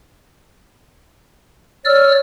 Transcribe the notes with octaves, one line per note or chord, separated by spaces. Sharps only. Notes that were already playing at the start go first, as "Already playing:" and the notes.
C#5 D5 E6 F6